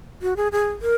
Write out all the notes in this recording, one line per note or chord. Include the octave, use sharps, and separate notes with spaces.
F#4
G#4
G#4
A#4